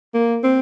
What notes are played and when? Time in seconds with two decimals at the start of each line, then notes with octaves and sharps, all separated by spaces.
0.14 A#3
0.44 C4